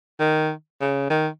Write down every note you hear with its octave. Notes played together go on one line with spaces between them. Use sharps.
D#3
C#3
D#3